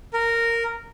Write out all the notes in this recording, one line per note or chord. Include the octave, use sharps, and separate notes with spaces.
A#4